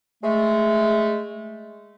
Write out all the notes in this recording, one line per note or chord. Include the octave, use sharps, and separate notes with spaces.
G#3 A3